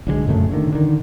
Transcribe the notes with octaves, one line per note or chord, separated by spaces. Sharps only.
B1 D3 E3 G#3
F#2 A#2 C#3 A3
A2 D3 D#3
D3 D#3